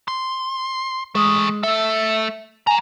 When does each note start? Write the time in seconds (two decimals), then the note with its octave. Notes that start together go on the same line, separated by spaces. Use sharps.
0.08 C6
1.15 E3 G#3 A3
1.63 A3 A4 E5
2.67 F#5 G#5 A#5